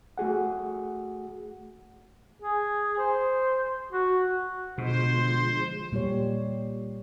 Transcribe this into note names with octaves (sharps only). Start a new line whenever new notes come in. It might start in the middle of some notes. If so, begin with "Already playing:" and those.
A3 F#4 G#4 F#5
G#4
C5
F#4
B2 D3 F3 G#3 C5
A#2 G3 G4 C#5